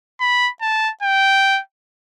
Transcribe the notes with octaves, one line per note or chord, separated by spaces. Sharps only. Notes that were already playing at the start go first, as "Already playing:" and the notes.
B5
A5
G5